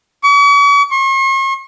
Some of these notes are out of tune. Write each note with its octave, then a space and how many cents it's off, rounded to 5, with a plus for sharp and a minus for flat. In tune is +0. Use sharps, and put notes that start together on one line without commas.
C#6 +45
C#6 -45